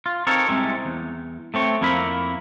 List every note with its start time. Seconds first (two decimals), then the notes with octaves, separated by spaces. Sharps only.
0.06 F4
0.27 C4 D#4 A4 A#4 C#5
0.48 C2 C3 G#3
0.85 E2
1.54 A3 C4 C#5
1.81 F2 A#3 E4 A#4 B5